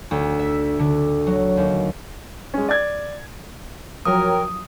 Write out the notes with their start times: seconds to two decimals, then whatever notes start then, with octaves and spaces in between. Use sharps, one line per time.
0.11 D2
0.39 E5
0.79 D3
1.27 F#3
1.57 D#2
2.54 G#3 C#4
2.69 D5 G#6
4.05 F3 F#3 F#4 A#4 C#5 G5 D#6